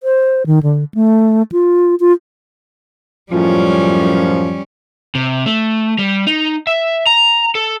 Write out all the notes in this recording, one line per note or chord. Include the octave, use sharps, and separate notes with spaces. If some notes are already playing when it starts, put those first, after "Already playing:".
C5
D#3
D3
A3
F4
F4
F#2 A2 F3 G3 C#4
C3
A3
G3
D#4
E5
A#5
A4